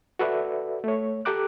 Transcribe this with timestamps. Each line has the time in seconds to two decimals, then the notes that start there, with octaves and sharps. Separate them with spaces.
0.19 F#4 A4 B4 D5 E5
0.84 A3 C#5
1.25 G4 A4 G5 A#5 D6 F#6